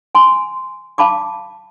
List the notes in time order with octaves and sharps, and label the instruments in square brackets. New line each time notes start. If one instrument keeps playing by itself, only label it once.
[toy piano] G#5 C6
F5 A5 B5 D6